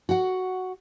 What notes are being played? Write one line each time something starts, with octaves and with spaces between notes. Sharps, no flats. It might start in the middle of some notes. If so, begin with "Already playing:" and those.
F#4 F#5